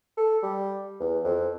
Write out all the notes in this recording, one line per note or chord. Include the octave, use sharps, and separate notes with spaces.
A4
G3
E2
F2